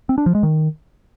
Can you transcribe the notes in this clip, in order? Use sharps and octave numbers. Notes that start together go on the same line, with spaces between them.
C4
D4
F3
G#3
D#3